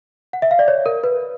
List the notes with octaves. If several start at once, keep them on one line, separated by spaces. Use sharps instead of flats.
F#5
E5
F5
D5
C#5
A#4
B4